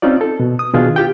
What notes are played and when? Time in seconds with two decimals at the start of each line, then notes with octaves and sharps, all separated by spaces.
0.02 C4 C#4 D#4 F4 D5
0.21 A4
0.40 B2
0.59 D#6
0.74 B2 D#3 D4 F4 G#4
0.96 F4 G4 G5